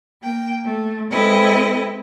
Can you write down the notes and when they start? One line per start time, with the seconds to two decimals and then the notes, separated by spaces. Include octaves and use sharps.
0.22 A#3 G5
0.64 A3
1.11 G#3 C4 E4 A4 B4 D#5